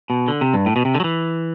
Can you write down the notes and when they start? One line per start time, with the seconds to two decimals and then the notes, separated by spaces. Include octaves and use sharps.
0.10 B2
0.28 D3
0.41 C3
0.53 G2
0.66 A2
0.76 B2
0.85 C3
0.95 D3
1.00 F#3
1.04 E3